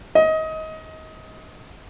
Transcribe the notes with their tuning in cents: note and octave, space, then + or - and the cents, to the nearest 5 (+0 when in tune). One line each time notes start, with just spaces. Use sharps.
D#5 +25